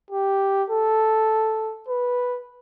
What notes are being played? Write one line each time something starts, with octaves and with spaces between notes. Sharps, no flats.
G4
A4
B4